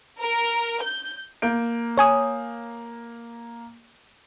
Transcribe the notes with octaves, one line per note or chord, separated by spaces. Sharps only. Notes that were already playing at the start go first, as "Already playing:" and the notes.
A#4
G6
A#3 G6 D7
C#5 G#5 D#6